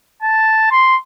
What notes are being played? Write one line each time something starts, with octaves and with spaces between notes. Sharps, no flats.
A5
C6